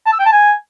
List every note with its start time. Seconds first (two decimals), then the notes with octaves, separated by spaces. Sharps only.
0.06 A5
0.13 E6
0.19 G5
0.26 A5
0.32 G#5